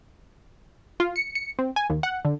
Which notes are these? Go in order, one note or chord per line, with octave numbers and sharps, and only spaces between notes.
F4
C#7
C#7
C4
G#5
D#2
F#5
D3